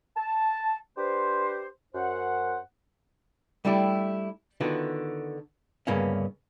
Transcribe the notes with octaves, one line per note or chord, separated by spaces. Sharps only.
A5
D4 G4 B4 C5
F#2 C5 F#5
G3 A3 D4 E4 G4
D3 D#3 B3 D4 F4 F#4
D2 G2 C#3 A#3 B3 C#4